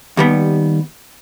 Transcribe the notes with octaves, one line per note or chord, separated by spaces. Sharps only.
D#2 G3 B3